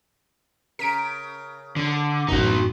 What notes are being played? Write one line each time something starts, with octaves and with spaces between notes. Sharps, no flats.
C#3 A#4 B6 D7
D3
A1 F#2 D#4 F#4